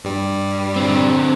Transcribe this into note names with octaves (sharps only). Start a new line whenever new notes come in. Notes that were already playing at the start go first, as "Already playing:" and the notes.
G2 G3
D3 C4